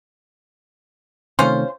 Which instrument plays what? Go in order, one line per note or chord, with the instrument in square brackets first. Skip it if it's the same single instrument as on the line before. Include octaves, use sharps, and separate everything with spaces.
[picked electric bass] C3 D#3 A3 [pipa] C#4 F4 C5